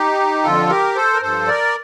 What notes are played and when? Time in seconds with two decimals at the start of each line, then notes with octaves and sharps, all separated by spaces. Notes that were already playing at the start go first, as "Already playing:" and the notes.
Already playing: D#4 G4
0.43 F2 D3 F3 F4 A4
0.69 G4 A#4
0.95 A4 C5
1.14 A#4
1.22 G2 F3 A4 C5
1.47 A#4 D5